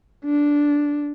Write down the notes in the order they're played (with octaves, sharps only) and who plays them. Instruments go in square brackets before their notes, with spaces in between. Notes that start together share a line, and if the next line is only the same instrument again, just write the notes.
[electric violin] D4